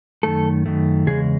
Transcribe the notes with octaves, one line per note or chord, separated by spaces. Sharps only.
F#2 D#3 A3 A4
F#2 D#3 A3
E2 C#3 G#3 G#4